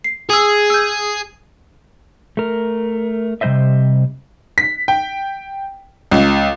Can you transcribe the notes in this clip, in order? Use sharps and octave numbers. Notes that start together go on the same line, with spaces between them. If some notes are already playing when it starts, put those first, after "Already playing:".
C7
G#4 D#6 E6
E6 G6
A3 A#4
C3 G3 C4 C5 D#5 E5
B6
G5
C#2